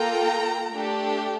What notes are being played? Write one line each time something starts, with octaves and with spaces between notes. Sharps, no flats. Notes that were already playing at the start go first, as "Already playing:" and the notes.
Already playing: A#3 F4 A4 G5 A#5
A3 D4 G4